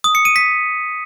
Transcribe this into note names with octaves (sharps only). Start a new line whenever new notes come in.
D#6
C#7
D#7
B6